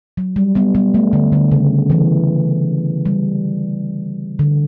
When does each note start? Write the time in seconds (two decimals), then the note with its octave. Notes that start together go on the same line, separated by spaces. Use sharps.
0.17 F#3
0.36 G3
0.55 G3 B3
0.75 G3 B3
0.94 A3
1.13 D3
1.32 D3
1.52 C#3
1.90 E3
3.05 G3
4.39 D3